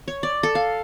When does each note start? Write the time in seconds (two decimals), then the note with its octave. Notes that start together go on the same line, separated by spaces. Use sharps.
0.08 C#5
0.23 D5
0.43 A4
0.55 F5